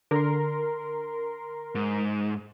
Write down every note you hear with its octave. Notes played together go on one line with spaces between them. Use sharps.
D3 A#4 C6
G#2